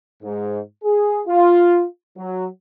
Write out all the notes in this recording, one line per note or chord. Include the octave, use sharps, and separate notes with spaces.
G#2
G#4
F4
F#3